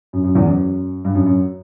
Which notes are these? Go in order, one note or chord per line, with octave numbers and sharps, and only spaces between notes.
F#2
F#2
E2
F#2
G2
F#2
F#2